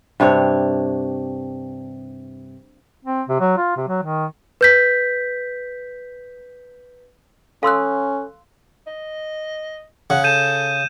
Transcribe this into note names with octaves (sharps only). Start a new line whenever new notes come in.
G2 C3 D4 C#5
C4
C3
F#3
F4
C3
F#3
D#3
B4 G6 B6
C#4 A4 F5 C6 E6 F#6
D#5
C#3 F#5
A4 G6 D#7 E7